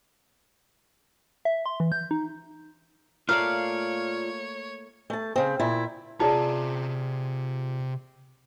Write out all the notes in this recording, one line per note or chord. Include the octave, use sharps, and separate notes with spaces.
E5
C6
E3
G6
D#4
A3 A#3 F4 C#5 D5 F5
A3 A5
C#3 C4
A#2 E4
C3 F4 G#4 D5 A5 A#5